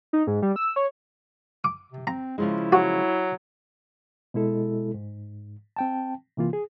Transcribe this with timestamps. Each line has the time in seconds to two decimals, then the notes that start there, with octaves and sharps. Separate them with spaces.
0.13 D#4
0.27 G#2
0.42 G3
0.56 E6
0.76 C#5
1.64 D6
1.92 C3
2.07 C4 A#5
2.38 C#3 F3 G#3 E4
2.72 F#3 F#4
4.34 B2 G#3 E4 A4
4.94 G#2
5.76 C4 G5 A5
6.37 C3 E3 A#3 F4
6.53 G#4